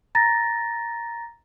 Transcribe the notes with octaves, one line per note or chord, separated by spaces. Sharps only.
A#5 A6 A#6